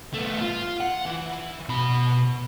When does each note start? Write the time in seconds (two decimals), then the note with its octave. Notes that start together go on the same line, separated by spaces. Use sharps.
0.14 A3 B3
0.42 F4
0.80 F#5
1.06 E3
1.69 B2 B5